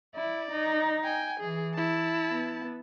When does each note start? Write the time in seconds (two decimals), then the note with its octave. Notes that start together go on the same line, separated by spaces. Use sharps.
0.16 E4 D5
0.51 D#4
1.04 G5 G#5
1.40 E3 G#4
1.75 E4 A5
2.30 B3